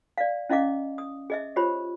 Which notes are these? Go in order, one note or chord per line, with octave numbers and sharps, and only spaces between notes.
D5 F5
C#4 E4 D#5 F5 D6
D#6
G#4 D#5 E5
F4 G4 C5 C#5 B5